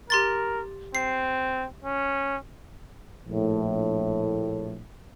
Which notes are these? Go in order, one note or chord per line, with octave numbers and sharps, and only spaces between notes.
G4 A#4 C6 A6
C4 C7
C#4
A#1 A2